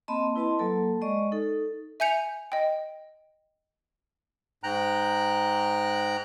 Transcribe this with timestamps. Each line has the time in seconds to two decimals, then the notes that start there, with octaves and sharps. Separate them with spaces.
0.08 A#3 C4 D#5 A5 B5 C6
0.36 E4 B4 D#5 A5 C6
0.59 F#3 A#3 A4 A5
1.01 G#3 D5 D#5 C#6
1.32 D#4 A4
2.00 E5 G#5 G6 C#7 F7
2.52 D#5 G5
4.64 G#2 G5 A#5 F#6